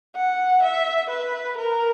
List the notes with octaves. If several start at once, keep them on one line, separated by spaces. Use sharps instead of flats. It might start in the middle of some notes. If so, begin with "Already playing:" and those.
F#5
E5
B4
A#4